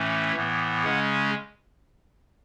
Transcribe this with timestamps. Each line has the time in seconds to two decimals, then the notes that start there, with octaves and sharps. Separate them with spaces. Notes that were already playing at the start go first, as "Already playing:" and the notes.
Already playing: A2 E3 A3 C#4
0.35 A2 E3 B3
0.84 C#3 G#3 C#4 F#5